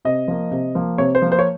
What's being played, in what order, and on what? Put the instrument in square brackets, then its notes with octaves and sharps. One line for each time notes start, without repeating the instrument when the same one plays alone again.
[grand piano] C3 D#5
F3 A#3
C3
F3 A#3
C3 C#5
C5
F3 A#3
C5
C#5